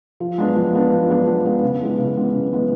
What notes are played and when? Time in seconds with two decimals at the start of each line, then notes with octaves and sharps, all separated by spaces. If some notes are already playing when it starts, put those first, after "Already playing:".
0.20 F3
0.38 G#3 B3 D4
0.56 F3
0.73 G#3 B3 D4
0.91 F3
1.09 G#3 B3 D4
1.27 F3
1.44 G#3 B3 D4
1.63 C#3
1.81 E3 G#3 B3
1.98 C#3
2.16 E3 G#3 B3
2.33 C#3
2.51 E3 G#3 B3